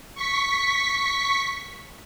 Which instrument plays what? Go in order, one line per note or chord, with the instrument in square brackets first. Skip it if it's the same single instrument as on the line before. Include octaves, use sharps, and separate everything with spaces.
[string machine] C#6 B6